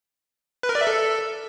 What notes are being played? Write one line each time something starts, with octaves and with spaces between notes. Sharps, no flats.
B4
A#4
D5
E5
A4